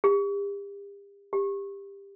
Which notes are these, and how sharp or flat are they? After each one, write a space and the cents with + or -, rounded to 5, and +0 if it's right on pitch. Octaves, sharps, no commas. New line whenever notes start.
G4 +40
G4 +20